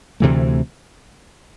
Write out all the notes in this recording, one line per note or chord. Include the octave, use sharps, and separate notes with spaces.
D2 C3 E3 A3